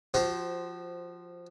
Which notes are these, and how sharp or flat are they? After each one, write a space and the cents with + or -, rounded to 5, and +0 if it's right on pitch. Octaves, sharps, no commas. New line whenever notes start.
F3 +5 F#4 +40 C5 +0